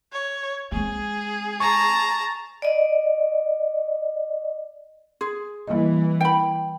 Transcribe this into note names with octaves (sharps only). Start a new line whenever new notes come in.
C#5
G#3 C4 G#4
A5 A#5 C#6
D5 D#5
G#4 C6
E3 G3 A#3 D#5
G5 B5